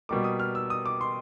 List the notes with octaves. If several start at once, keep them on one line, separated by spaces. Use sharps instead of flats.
B2 G3 A#3 D6
D#6
F6
E6
D#6
D6
C6